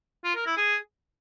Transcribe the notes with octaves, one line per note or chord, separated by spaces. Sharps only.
F4
A#4
E4
G#4